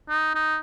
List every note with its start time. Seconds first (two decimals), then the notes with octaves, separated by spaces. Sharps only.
0.09 D#4
0.35 D#4